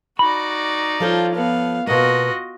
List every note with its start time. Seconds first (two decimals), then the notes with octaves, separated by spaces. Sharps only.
0.19 D#4 F#4 D5 B5
1.00 F3 F4 A4 C5 C#5
1.35 B3 F5
1.87 B2 A#3 F4 F#4 D#5